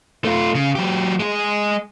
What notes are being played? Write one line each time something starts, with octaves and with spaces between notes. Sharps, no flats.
A3 F4
C#3
F#3 G4
G#3 G#4